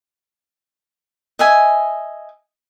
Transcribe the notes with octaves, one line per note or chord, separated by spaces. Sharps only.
D#5 E5 G#5